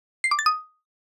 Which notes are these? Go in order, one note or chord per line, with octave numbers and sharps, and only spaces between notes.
C7
D6
A6
D#6